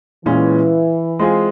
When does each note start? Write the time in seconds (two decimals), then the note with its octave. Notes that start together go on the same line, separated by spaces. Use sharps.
0.25 A#2 E3 G#3 C#4
1.19 G#3 C4 F4 G#4